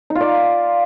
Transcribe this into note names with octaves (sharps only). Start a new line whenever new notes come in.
D#4
F4
D5